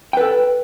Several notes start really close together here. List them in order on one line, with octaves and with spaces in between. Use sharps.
G5 B4 A4